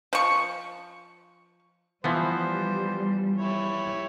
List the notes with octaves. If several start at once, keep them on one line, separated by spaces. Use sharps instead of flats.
F3 C#6
E3 F3 G3 B3 C5
E4 G4 C#5